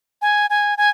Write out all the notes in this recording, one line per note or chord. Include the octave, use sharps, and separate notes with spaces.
G#5
G#5
G#5